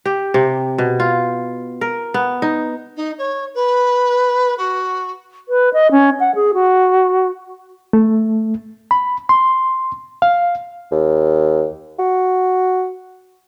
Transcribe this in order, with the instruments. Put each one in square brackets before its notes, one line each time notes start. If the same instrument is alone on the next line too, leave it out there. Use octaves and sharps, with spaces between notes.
[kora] G4
C3
B2
F4
A#4
B3
D#4
[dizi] D#4
C#5
B4
F#4
[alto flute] B4
D#5
C#4
F#5
G#4
F#4
[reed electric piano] A3
B5
C6
F5
[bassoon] D#2
F#4